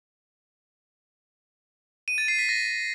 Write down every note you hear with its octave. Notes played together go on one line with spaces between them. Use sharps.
D#7
A6
C7
B6
A#6